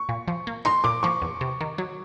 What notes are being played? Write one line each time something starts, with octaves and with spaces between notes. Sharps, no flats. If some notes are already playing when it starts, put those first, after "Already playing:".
Already playing: C#6
A#2
F3
A#3
D#4 C6
A#2 D6
F3 C#6
E2
C3
D#3
F#3